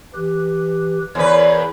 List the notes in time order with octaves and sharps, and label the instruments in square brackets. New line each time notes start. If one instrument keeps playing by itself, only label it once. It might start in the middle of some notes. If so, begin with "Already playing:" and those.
[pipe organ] E3 G4 B4
[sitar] E2 B4 [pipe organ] A#4 C#5